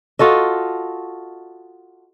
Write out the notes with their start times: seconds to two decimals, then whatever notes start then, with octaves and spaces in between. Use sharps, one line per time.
0.19 F4 F#4 A4 D#5